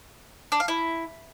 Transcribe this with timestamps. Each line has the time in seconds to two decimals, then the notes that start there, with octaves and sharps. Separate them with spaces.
0.52 D4
0.60 F5
0.68 E4